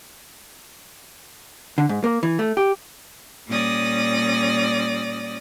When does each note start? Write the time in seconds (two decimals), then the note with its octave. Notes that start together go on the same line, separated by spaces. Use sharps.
1.78 D3
1.89 G#2
2.04 A#3
2.23 E3
2.39 A3
2.57 G4
3.47 A#2 G3 C#4 D5 D#6 A#6